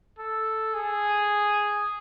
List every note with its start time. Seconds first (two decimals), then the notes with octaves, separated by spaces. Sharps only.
0.19 A4
0.74 G#4